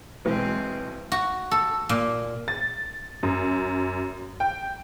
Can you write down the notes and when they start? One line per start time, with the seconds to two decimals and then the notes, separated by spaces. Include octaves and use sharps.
0.25 B1 B2 E3 G#3 C4
1.12 F#4
1.51 A4
1.89 A#2
2.48 A6
3.23 F#2
4.40 G5